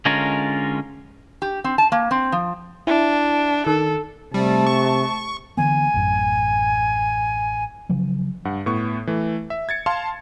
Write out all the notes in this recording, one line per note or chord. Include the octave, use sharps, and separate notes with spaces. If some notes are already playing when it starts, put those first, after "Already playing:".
D3 G#3 C#4 F4 A#4
G4
C4
A5
A#3
C4
F3
D4 E4
D#3 A4
C3 G3 A3 A5
C#6
D3 E3 B3 G#5
A1 F#2
C#3 F3 F#3
G2 F#5
A2 B3 C#6
E3 A3
E5
G#6 A6 C#7
F5 A5 C6